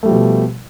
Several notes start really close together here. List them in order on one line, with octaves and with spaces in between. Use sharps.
A3 G3 F3 B2